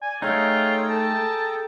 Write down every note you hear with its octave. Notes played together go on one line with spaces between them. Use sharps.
D5 G#5
A3 D#4 F4 G#4 C#5 G5 A#5
A4 A5